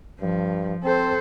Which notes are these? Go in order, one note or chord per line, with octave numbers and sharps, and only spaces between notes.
G2 F3
C4 A4 C5